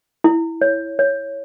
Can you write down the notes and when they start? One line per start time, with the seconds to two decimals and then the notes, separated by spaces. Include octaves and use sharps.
0.24 E4
0.61 C#5
0.99 C#5